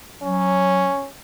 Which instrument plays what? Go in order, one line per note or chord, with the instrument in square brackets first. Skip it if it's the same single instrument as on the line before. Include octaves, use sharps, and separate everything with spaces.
[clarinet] F#3 [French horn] C#4